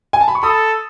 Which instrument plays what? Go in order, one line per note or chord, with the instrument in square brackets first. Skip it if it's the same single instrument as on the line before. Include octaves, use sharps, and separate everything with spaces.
[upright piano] G#5
A5
B5
C#6
[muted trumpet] A4 [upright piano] B5 D#6